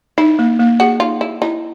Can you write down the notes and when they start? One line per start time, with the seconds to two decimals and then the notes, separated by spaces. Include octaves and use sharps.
0.18 D#4 E4
0.39 A#3
0.60 A#3
0.80 F#4 G#4
1.00 D#4 F4
1.21 E4 G#4
1.42 D#4 E4